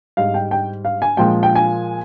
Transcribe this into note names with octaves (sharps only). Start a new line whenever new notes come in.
G#2 G3 F5
G5
G5
F5
G#5
A#2 F3 G#3 G5
G5
G#5